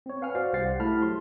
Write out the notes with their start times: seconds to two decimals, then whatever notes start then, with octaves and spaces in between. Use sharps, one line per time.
0.06 C4 C#5
0.22 B4 F5 F#5 G#5 F6
0.35 F#4 C5 D5 F5
0.53 C2 G4 C5 F#5 A6 C7
0.80 A3 E4 G4 A5 B5 F6
1.02 F#3 C6